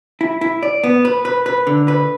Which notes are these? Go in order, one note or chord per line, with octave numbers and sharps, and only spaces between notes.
E4
E4
D5
B3
B4
B4
B4
D3
B4